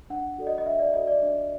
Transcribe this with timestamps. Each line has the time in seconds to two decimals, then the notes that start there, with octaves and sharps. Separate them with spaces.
0.10 D4 F#5
0.38 F#4 A4 D5
0.47 D#5
0.58 D#5
0.66 D4 E5
0.79 D5
0.93 F#4 A4 D5 D#5
1.07 D5
1.22 D4 D5